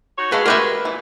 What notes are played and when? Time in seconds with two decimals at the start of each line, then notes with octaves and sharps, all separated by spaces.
0.19 D#4 F#4 C#5
0.32 G#3 F#4 A4 B4 F5
0.46 F#4 G4 A#4 B4 E5 G5
0.85 A#2 E3